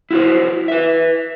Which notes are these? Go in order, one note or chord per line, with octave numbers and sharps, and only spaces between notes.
E4 F#4 A#4 C5
B4 E5